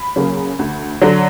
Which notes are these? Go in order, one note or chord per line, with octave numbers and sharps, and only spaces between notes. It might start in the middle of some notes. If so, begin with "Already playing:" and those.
Already playing: B5
C#3 F#3 A#3
D2
D3 F#3